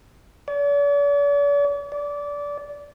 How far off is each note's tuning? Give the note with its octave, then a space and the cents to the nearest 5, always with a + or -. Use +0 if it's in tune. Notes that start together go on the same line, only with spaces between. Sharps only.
D5 -45
D5 -20